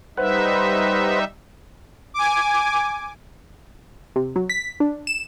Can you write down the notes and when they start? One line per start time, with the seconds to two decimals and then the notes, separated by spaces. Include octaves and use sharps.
0.17 G3 D#4 B4 C5 E5 F#5
2.14 G#5 D6
4.16 C3
4.36 F#3
4.50 B6
4.80 D4
5.07 E7